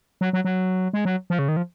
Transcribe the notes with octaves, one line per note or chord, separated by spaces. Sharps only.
F#3
F#3
F#3
G#3
F#3
F3
C#3
D#3
F3